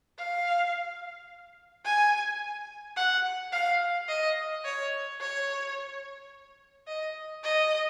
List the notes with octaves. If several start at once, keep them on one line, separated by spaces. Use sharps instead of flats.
F5
G#5
F#5
F5
D#5
C#5
C#5
D#5
D#5